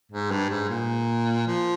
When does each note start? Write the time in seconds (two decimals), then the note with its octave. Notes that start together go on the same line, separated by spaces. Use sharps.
0.12 G#2
0.31 G2
0.50 G#2
0.70 A#2
1.48 F3